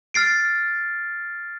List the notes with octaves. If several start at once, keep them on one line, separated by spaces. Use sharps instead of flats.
F6 A6 C7 D7